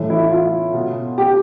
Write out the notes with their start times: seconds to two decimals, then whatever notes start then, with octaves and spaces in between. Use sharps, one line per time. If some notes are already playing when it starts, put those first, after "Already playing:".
Already playing: A2 E3
0.10 E4
0.31 F4
0.74 B2
1.18 G4